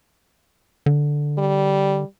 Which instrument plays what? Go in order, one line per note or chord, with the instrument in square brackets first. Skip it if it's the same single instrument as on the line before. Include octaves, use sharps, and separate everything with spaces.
[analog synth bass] D3
[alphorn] G3